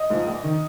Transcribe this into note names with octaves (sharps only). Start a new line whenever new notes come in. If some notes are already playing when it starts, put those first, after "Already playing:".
Already playing: D#5
G#2 F3
A#1
D#3